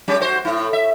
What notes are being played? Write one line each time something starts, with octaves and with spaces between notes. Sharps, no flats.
G3 C#4 G4
F#4 C5
A2 E4
E5